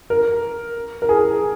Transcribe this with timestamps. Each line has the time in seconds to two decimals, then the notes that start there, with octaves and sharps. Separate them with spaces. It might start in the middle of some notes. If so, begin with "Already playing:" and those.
0.10 A#4
1.02 A#4
1.09 G#4